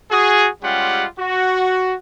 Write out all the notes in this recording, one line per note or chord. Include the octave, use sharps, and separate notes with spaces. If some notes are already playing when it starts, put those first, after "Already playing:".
F#4 G#4
G3 G#3 C#4 F4 G4 F#5
F#4